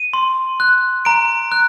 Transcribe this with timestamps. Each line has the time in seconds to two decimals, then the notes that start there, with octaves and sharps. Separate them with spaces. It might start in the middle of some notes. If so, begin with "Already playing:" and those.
Already playing: D#7
0.13 C6
0.60 F#6
1.05 A#5 D7
1.52 F#6